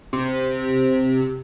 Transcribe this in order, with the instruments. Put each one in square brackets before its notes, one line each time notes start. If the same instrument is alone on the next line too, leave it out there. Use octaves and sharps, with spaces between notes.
[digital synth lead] C3